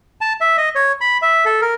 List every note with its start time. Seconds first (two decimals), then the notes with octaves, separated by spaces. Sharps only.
0.21 A5
0.41 E5
0.58 D#5
0.75 C#5
1.01 B5
1.22 E5
1.45 A4
1.62 A#4